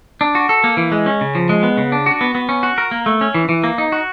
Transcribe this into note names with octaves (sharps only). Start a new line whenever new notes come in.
D4
F#4
A4
A#3
E3
G#3
C#4
C#3
F3
G#3
B3
C#3
D4
F#4
B3
B3
C#4
F#4
A#4
A#3
A3
C#4
E3
E3
A#3
D#4
F#4